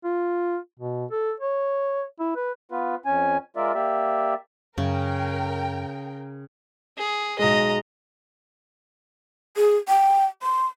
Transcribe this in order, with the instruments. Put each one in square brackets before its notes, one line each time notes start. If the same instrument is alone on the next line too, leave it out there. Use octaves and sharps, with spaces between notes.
[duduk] F4
B2
A4
C#5
E4
B4
[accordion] B3 F4 B4
F2 C#4 G#5
G#3 F4 A#4 D5 E5
A#3 G4 D5 E5
[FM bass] F#2 [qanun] C#3 [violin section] A#4 G5
[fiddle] G#4
[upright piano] B1 G#3 [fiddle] D#5 A#5
[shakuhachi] G#4
G5
C6